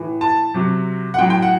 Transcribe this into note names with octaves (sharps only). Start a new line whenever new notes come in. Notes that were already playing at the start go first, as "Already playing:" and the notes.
Already playing: A2 E3
A5
C3 F#3
F#5
A2 F#3 G5
G5
F#5